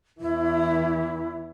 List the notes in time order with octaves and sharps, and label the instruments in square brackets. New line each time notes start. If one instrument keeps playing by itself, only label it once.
[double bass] E2 E3 [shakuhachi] E4